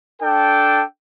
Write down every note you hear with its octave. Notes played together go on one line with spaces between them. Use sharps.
D4 A4 G5